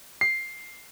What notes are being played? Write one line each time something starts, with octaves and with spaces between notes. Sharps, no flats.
C7